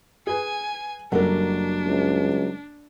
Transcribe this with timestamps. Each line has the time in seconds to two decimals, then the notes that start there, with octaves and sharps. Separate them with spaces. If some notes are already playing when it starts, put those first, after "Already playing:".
0.27 G#4 B4 G#5
1.12 F#1 F#3 G3 D4 A4 A#4 F#5
1.87 C#2